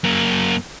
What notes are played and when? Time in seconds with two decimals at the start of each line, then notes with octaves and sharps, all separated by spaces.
0.04 F#2 A#3